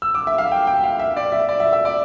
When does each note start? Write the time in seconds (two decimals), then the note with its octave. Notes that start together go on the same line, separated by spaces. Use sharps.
0.02 E6
0.15 D6
0.27 E5
0.38 F5
0.52 G5
0.67 G5
0.84 F5
0.99 E5
1.17 D5
1.32 E5
1.49 D5
1.60 E5
1.73 E5
1.85 D5